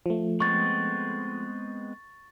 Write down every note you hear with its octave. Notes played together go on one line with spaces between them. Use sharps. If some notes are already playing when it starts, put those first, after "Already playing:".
F3 A3
G#3 B3 C4 C#6 A6